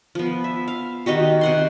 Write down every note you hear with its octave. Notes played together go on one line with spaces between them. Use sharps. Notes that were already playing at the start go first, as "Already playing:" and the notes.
F3 B3
E5
F5
D#3 D#4 F#4 G4
C3 F#5 C6